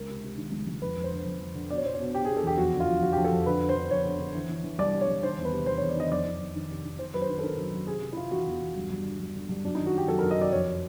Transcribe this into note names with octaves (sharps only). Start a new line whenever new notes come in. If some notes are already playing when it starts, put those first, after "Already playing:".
Already playing: C#2 A#4
C3
C3
D#3
C#2
C#2
F2 B4
F2
C5
D3
F2
F2
D3
B2 D5
C#5
B2 C5
C#5
B2
B2 G4
B2 G#4
A4
E2 G4
F2 F#4
D3
F4
F2
F2 F#4
F2 G4
A4
F2
D3 B4
D3
C5
D3
F2 C#5
D3
D3
E3
E3
E3
C2 D5
C3
C#5
C2
D#3 C5
E2
B4
C3
E2 C5
E2 C#5
D5
D#3 D#5
D#5
F2 D5
D#3
F2
D#3
C3
D#3
D#3 C5
F#2 B4
C5
D#3
A4
D#3 A#4
F#2
F#2
C3 G#4
C3
E4
C3 F4
E3 F#4
E2
E2
G2
G2
D3
G2
D3
G2
F#2 D4
D#3 D#4
F#4
D#3 G4
F#2 A4
F#2 A#4
D#5
F#2 D5
F2 C#5